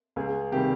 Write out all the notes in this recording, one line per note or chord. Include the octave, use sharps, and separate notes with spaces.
C#2 G#4
C3 D#3 G3 G4